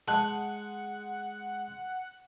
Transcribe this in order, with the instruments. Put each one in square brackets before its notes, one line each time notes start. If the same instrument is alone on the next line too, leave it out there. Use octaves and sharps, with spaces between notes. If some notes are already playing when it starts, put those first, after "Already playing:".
[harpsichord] G#3 [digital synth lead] F#5 [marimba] A5 [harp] F#6